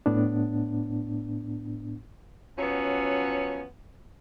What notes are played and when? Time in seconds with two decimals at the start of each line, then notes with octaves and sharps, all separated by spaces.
0.06 A2 B3 D4
2.58 F3 F#3 B3 C#4